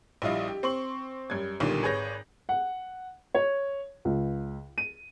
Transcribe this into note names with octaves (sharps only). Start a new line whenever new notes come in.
A#1 G3 E4 F4 D#5
G4
C4 C6 C#6 F#7
F#2 G3 G#6
B1 A#2 D3 D#3 G3
G#1 G#4 B4 C#5 G6 A#6
F#5
C#5
C#2
D#7